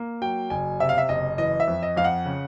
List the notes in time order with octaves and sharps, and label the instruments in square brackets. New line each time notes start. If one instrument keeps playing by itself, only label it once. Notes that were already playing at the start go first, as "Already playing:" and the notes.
Already playing: [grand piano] A#3
F#3 G5
F#1 G#5
C3 E5
F5
E5
F#1 D#5
E3 D#5
E5
F2
D#5
F2 F5
F#5
C#3